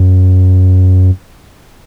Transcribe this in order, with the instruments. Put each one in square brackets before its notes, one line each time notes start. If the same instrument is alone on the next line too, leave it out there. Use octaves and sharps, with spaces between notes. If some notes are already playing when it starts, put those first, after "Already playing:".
Already playing: [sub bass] F#2